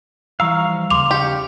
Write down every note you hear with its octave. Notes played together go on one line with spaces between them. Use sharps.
E3 F3 G3 F5 A#5 C#6 E6
D#2 C#3 C6 D6 F7
C#3 G4 C#7